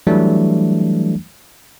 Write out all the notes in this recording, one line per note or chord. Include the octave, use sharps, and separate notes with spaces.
E3 F#3 G3 A3 D4